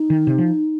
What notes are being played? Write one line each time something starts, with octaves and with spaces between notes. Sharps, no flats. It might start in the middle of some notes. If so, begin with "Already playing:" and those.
Already playing: D#4
D#3
C3
F3